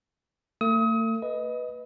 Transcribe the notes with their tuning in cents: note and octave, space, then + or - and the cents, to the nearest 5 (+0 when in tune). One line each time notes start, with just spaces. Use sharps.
A3 +40 D#6 +35
B4 +0 D#5 +5